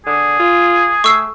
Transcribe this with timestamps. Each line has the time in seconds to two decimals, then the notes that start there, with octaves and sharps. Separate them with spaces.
0.06 D3 G#4
0.40 F4
1.04 A3 C#6 E6 C7